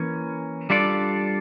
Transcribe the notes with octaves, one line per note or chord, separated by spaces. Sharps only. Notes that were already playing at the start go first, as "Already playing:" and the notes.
Already playing: E3 A#3 C#4
G3 D4 F4 A4 D5